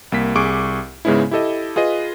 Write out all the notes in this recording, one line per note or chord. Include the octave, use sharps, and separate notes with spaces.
C2 A#3 B6
C2 G#4 C#6 D6 D7
G#2 C#3 G#3 B3 C#4 E4
E4 G4 A4 D#5
F4 G#4 B4 D#5